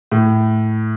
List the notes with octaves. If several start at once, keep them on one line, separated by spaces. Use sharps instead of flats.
A2